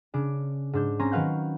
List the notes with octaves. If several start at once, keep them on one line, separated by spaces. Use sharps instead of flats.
C#3 D4 D7
G#2 D4 G6
C4 C#4 G#5 A#5 C6
D#3 F#3 B4 F5 F#5 G6